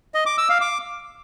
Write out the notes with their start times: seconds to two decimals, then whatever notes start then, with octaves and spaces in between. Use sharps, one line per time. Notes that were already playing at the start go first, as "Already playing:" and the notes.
0.14 D#5
0.26 D6
0.38 E6
0.49 F5
0.61 D6